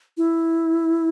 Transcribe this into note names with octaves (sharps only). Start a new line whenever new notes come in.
E4